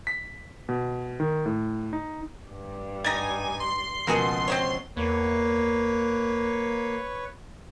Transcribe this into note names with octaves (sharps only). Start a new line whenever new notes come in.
B6
B2
D#3
A2
D#4
G2
G3 D#4 G#5 A6 A#6
C6
C#2 B2 F3 A#3 F#4 G#4
C4 C5 C#5
E2 A#3 B4 C#5